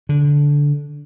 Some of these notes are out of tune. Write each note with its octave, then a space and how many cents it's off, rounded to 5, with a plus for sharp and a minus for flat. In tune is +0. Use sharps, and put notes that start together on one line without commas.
D3 -15